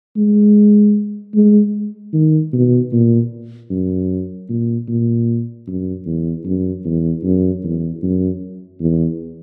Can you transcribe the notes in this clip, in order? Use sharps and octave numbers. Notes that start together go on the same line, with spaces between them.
G#3
G#3
D#3
B2
A#2
F#2
A#2
A#2
F#2
E2
F#2
E2
F#2
E2
F#2
E2